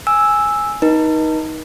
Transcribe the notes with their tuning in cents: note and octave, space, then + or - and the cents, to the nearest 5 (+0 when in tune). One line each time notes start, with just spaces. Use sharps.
G#5 +0 E6 -5
D#4 +10 A#4 +45